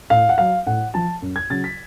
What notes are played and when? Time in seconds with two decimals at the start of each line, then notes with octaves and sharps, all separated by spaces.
0.10 A2 F5
0.29 F#5
0.38 F#3 F5
0.67 A2 F#5
0.94 F3 A5
1.22 F#2
1.36 G#6
1.50 C#3 F#3 A6
1.64 B6